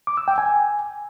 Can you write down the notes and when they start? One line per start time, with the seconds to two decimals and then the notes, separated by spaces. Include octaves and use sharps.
0.07 D6
0.17 E6
0.28 G5
0.38 G#5